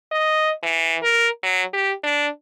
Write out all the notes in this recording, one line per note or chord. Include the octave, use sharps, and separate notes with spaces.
D#5
E3
A#4
F#3
G4
D4